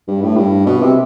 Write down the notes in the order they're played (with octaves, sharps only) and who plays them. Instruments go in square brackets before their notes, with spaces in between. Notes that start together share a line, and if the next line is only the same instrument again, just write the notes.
[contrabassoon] G2
A2
G2
B2
C3